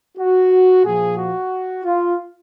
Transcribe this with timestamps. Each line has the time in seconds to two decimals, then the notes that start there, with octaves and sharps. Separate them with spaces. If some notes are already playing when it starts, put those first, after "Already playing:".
0.18 F#4
0.85 A#2 F3 G#4
1.18 F#4
1.84 F4